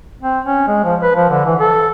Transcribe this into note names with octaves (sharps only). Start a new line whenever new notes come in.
C4
C#4
G#3
F3
B4
F3
D3
E3
A4